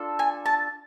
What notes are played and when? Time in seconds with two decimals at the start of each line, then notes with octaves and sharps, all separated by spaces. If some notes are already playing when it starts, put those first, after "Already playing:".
Already playing: D4 F4 A4
0.19 G#5
0.46 A5